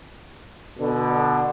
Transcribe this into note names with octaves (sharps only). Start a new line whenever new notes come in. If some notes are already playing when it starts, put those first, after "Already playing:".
B2 D3